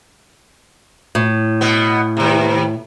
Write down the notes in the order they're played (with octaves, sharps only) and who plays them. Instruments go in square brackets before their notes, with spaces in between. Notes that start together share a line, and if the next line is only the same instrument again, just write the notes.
[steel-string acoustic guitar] A2
[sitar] B2 B3
D#2 C3